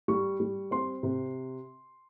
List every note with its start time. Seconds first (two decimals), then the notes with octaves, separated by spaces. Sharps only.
0.08 G3 C#6
0.40 G3
0.71 C4 C6
1.03 C3